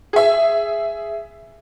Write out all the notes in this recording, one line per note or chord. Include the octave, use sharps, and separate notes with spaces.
G#4 E5